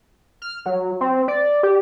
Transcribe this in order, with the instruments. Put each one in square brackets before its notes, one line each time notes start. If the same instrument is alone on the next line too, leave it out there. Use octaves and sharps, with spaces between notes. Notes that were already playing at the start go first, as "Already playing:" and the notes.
[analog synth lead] F6
F#3
C4
D5
G4